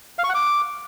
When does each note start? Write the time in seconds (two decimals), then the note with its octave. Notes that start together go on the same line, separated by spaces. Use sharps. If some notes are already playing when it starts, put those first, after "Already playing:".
0.19 F5
0.24 C#6
0.29 F#5
0.35 D6